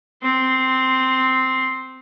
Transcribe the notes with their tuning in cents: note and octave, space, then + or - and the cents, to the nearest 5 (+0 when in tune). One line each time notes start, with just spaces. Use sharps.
C4 -10 C6 +0